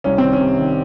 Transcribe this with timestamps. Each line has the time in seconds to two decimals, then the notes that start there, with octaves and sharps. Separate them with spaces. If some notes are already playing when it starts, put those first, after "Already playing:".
0.04 C2 C#4
0.18 D#3 C4
0.33 C#4
0.40 C3
0.58 D#3